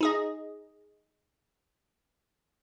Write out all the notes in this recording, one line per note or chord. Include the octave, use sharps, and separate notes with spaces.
D#4 G#4 D#5